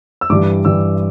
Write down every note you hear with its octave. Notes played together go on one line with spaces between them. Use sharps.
E6
G2 E3 G3 D6
G2 E3 G3 E6